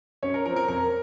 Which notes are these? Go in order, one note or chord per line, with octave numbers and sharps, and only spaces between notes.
F#2 C#4 C#5
A#4
F3 C4 A#4
A#4
F2 A#4